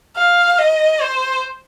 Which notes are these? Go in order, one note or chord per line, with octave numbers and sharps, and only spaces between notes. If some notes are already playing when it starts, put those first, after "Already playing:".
F5
D#5
C5